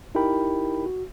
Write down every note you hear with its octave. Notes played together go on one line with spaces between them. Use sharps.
D#4 E4 G4 A#4 G5 B5
F#4